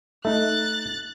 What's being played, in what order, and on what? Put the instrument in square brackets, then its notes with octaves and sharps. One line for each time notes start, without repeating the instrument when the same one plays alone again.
[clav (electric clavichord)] A3 D#4 [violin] F#6 A6